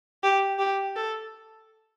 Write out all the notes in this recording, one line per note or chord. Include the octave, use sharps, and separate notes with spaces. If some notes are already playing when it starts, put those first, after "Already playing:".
G4
G4
A4